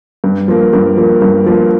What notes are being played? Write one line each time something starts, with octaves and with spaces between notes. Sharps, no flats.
G2
F3 A#3
G2
F3 A#3
G2
F3 A#3